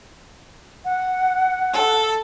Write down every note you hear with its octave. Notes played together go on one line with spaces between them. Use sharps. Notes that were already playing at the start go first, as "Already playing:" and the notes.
F#5
A4